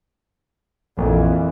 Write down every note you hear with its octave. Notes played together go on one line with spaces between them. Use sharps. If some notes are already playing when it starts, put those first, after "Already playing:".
A#1 F2 E3